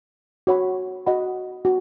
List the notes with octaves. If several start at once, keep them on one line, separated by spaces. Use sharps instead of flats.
F#4 C#5 F#5 B5
F#4 D#5 F#5 B5
F#4